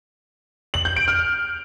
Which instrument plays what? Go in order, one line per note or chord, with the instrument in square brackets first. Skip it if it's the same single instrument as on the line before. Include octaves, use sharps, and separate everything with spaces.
[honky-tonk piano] F#7
G6
D7
F6